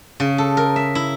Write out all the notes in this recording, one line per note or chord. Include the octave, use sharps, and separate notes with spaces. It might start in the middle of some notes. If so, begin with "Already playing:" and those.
C#3
A4
A#4
E5
E4